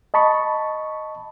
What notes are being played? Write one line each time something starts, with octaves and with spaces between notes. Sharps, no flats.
D#5 A5 B5 C#6